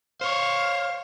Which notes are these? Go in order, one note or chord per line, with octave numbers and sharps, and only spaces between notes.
C5 C#5 F5